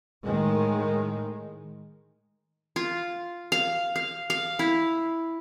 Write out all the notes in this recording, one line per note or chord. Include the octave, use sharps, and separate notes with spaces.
A2 D#3 G#3
F4
F5
F5
F5
E4